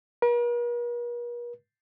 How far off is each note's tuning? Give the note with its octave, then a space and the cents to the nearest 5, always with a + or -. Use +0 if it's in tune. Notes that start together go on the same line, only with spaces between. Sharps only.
A#4 +45